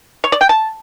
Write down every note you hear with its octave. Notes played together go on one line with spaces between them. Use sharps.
C#5
D5
G5
A5